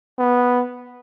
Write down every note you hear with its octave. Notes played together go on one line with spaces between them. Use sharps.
B3